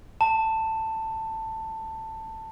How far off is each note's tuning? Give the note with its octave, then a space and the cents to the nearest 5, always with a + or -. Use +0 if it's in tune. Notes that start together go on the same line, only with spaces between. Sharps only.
A5 +15